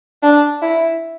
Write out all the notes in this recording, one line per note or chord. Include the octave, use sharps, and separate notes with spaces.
D4
E4